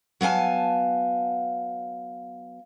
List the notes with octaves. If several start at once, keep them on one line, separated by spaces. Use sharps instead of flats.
F#3 B3 F5 G#5 A5